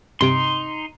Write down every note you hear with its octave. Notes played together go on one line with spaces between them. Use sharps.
G2 C3 D#4 C6 D7